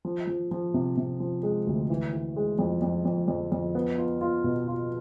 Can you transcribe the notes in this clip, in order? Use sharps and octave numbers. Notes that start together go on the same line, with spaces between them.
F3
F3
F3
C3
C3
F3
G#3
D2
E3
E3
G#3
F2
F2
F2
F2
F2
B3
F4
F4
B2
F4